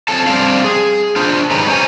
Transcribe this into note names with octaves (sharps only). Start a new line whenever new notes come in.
C4 C#4 F4 A4 A5
G3 C4 D4 F5
G#4
D4 F4 C5
G#2 D#3 C#4 G4 B4 A#5
C#4 C5 G5 G#5